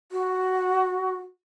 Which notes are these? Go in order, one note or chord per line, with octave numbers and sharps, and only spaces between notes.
F#4